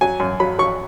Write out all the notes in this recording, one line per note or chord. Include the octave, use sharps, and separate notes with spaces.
F#3 G#5
F#2
F#3 B5
F#3 C#6